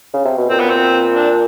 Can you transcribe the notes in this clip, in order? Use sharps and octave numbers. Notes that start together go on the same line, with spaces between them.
C#3
C3
B2
A#2 C4
B3
C4
D4